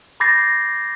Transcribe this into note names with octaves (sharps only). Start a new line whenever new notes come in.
B5 D6 G6 A6 A#6 C7